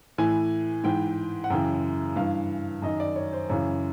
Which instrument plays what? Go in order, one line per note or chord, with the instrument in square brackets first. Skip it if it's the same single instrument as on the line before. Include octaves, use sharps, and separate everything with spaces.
[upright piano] A2 E3 G#5
G#2 E3 G5
F#5
F#2 C#3 E3 G5
G2 E3 F5
F#2 D#3 D#5
D5
C#5
C5
F#2 C#3 E3 C#5